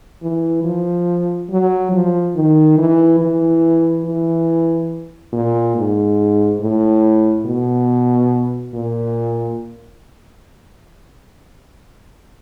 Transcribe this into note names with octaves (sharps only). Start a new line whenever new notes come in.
E3
F3
F#3
F3
D#3
E3
E3
E3
A#2
G#2
A2
B2
A#2